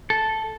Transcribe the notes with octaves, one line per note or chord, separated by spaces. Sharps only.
A4